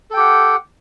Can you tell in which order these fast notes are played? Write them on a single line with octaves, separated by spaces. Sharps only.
A4 G5 G4 F#5